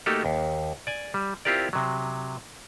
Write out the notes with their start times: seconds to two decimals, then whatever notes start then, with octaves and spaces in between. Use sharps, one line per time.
0.06 A3 A#3 D#4 F#4 G4 A4
0.25 D#2
0.87 D5 G#5
1.14 G3
1.45 C4 E4 F4 G4 A#4 D5
1.73 C3 F#3